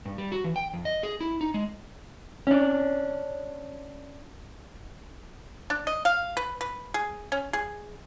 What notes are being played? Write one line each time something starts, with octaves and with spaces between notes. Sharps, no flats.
G2
G3
F#4
E3
G5
F2
D#5
G#4
E4
D#4
G#3
C#4 D4
D4
D#5
F5
B4
B4
G#4
C#4
G#4